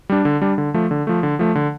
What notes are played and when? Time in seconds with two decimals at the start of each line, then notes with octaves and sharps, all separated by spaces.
0.09 G3 D4
0.25 D3
0.42 G3 D4
0.58 D3
0.74 F3 A3
0.91 D3
1.07 F3 A3
1.23 D3
1.39 F3 A3
1.55 D3